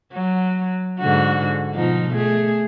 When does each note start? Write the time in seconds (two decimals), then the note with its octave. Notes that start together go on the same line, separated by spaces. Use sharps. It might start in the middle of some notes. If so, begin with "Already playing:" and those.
0.13 F#3
0.99 G#2 D3 F#4
1.75 B2 F3 D#4
2.15 A3 G#4